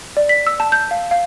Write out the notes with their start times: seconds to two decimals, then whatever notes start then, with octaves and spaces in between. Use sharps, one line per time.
0.17 D5
0.29 B6
0.47 E6
0.60 A5
0.72 G6
0.91 F5
1.11 F5